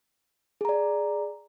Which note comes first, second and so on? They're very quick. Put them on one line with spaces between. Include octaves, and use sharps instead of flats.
G#4 A#5 D5